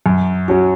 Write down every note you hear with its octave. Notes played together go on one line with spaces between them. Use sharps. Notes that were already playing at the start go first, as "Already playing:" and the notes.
F#2
F#3 C#4 F#4